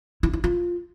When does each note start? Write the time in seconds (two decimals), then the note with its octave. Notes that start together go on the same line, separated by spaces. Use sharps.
0.23 E4
0.33 E4
0.44 F4